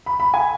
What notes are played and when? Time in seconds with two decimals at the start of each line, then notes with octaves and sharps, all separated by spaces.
0.06 B5
0.20 B5
0.34 G#5